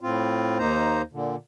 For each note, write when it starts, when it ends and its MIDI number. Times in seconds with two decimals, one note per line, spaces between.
0.01 0.58 45
0.01 0.58 60
0.01 0.58 65
0.58 1.02 39
0.58 1.02 58
0.58 1.02 63
0.58 1.02 72
0.58 1.02 82
1.13 1.36 46
1.13 1.36 50